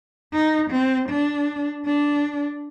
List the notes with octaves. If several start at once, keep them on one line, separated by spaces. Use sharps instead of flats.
D#4
C4
D4
D4